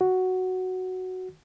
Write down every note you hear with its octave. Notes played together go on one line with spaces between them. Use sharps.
F#4